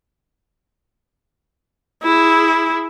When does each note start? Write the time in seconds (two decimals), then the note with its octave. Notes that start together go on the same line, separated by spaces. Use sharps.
2.03 E4 G#4